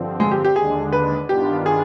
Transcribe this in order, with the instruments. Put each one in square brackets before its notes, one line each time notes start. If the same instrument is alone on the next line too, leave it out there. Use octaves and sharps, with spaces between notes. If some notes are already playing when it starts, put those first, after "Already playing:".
Already playing: [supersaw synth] G2 D3 F3 C4
[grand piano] G#3
G4
G4
[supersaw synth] D#2 D3 G#3 D4 [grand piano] G#4
[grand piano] B4
[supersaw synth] G2 D#3 B3 D4 F4 [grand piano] G4
[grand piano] G#4